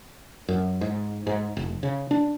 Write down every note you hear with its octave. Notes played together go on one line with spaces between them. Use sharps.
F#2
G#2
G#2
F1
C#3
D4